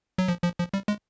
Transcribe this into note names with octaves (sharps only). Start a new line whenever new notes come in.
F#3
F3
F3
F3
G3
G#3